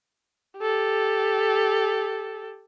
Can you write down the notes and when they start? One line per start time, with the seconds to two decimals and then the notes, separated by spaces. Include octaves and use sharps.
0.59 G4 A4